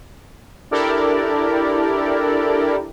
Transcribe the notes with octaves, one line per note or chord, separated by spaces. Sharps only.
D4 E4 G4 A4 A#4 D5